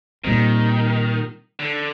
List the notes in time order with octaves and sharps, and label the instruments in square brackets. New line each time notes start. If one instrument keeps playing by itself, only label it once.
[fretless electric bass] A#2 G3 C4 [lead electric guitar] D#3
[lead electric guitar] D3